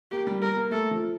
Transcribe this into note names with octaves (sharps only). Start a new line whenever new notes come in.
A#3 G4
G3
A#3 A#4
A#3
A3 A4
F3